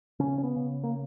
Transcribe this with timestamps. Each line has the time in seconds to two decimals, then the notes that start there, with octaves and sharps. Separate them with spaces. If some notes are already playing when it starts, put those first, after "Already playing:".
0.19 C#3 C#4
0.38 C#4
0.43 B3
0.56 C#3
0.84 A#3